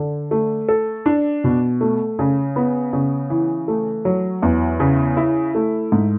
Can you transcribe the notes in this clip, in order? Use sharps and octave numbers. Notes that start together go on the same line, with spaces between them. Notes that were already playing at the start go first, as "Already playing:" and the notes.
Already playing: D3
A3
A4
D4
B2
A3
C#3
B3
C#3
E3
A3
F#3
E2
C#3
E4
A3
G#2